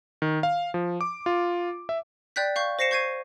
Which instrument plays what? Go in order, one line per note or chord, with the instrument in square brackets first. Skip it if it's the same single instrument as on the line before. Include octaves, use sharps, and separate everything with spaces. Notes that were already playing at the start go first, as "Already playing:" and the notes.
[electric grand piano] D#3
F5
F3
D6
F4
E5
[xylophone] D5 G5 F#6 G6 B6
F5 C#6 G6
C5 A#6 C7 C#7 E7
C#6 G6 G#6 C7 D#7